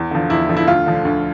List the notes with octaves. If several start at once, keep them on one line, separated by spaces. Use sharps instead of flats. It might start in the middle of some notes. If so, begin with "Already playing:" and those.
Already playing: E2
D3 F3
E2 E4
D3 F3
E4
D2 F4
D3 F3
D2